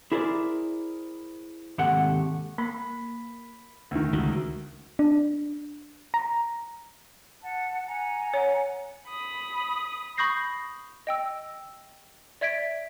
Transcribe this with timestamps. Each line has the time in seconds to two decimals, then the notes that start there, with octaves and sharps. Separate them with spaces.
0.12 E4 G#4 A#4 C5 D5
1.78 D#2 G#2 C3 A3 G4 F#5
2.58 A#3 B5
3.91 D2 D#3
4.13 C#2 F#4
4.99 D4
6.14 A#5
7.43 F#5 A5
7.87 F#5 G#5 A#5
8.34 C#5
9.08 B5 D#6
10.17 B5 C#6 D#6 G6 A#6 C7
11.07 D#5 G5 E6
12.41 D5 E5 G#6 B6 D7